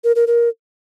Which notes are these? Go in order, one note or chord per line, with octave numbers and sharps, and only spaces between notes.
A#4
A#4
A#4